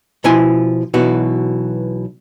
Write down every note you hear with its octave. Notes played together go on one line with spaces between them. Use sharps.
B2 F3 E4 G#5 C6
B1 B2 E3 F#4